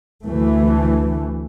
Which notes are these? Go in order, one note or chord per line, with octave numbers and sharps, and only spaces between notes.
D2 E3 A3